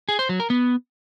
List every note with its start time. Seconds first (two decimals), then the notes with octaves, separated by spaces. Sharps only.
0.09 G#4
0.19 C5
0.29 F#3
0.40 A#4
0.50 B3